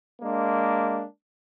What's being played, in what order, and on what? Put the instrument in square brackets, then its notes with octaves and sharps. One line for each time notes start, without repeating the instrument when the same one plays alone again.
[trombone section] G#3 A#3 D4